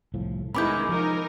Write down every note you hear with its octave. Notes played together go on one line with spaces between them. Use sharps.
C2 A2 F3
D#3 G#3 B3 C#4 E4 B5 D6 G6
F3 D#4 A#4